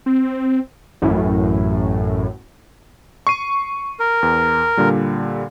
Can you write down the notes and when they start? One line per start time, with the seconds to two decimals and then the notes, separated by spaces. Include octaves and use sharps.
0.06 C4
1.02 A1 F#2 A2
3.27 C#6 C7 D#7
4.00 A#4
4.23 E2
4.77 A#2 D3 G3